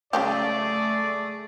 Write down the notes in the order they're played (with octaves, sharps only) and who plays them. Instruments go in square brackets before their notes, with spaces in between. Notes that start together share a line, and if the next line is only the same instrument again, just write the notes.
[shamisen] C#3 F#3 G4 [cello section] A3 G#4 [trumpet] D5